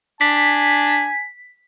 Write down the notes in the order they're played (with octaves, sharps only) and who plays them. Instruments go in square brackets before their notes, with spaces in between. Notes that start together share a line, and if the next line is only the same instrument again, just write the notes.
[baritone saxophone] D4 [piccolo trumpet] G#5 [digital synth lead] B6